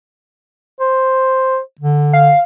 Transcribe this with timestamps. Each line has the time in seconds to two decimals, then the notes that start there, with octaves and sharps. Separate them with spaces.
0.80 C5
1.81 D3
2.13 F5